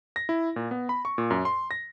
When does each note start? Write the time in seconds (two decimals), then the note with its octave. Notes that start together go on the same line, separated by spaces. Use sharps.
0.16 A#6
0.29 E4
0.56 A#2
0.71 B3
0.89 B5
1.05 C#6
1.18 A#2
1.30 F#2
1.45 C6
1.71 A#6